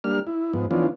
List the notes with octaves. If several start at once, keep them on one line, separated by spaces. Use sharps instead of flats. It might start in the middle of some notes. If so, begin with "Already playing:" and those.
G3 A#3 D4 F6
E4
G#2 F3 B3
E3 F3 B3 C#4 D4 F4